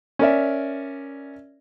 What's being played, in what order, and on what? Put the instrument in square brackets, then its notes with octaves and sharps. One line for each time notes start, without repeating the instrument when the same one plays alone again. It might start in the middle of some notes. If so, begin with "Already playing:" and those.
[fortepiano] C#4 A#4 D5 E5